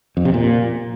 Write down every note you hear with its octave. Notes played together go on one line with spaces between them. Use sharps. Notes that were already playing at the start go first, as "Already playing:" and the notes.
F2
C3
A#2